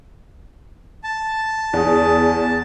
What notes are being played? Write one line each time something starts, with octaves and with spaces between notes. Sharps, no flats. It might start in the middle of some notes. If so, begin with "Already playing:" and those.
A5
E2 G#4